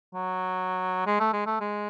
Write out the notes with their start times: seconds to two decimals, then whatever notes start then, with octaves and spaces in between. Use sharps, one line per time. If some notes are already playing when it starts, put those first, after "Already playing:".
0.14 F#3
1.06 G#3
1.20 A3
1.33 G#3
1.46 A3
1.60 G#3